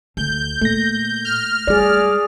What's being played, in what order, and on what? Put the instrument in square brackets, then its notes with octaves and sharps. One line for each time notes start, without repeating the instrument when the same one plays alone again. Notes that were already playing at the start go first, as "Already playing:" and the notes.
[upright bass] D2 [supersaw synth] G6
[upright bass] A#2 [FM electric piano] A3 A#6
[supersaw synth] F6
[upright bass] G3 [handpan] G#4 D5